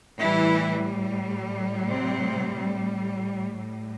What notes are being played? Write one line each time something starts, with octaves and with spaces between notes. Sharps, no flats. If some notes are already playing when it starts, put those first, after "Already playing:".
A2 E3 G3 E4
C3 C4
A2 G3